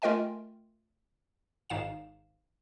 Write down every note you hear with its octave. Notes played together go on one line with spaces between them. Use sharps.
A3 F4 A#4 D#5 G5 G#5
G#1 G#2 F5 E7